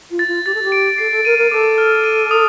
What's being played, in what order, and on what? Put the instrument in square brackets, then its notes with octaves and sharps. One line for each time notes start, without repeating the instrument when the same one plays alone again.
[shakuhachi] F4
[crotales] A6
[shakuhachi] F4
[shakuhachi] G4 [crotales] A6
[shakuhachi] A4
G4
[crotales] D7
[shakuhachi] A4 [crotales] C7
[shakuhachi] A4
[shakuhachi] A#4 [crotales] D#7
[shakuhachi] A#4
[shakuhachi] A4 [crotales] D6
[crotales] F6
D#7
D#6